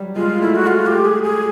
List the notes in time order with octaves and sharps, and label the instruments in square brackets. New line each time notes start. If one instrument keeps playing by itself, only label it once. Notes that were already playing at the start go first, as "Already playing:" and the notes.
Already playing: [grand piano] F#3 G3
[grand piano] G#3 [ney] F4
[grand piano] A3 [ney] E4
[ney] F#4
F4
G4
G#4
G#4